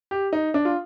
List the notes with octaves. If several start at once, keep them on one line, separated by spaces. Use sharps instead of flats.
G4
D#4
D4
F4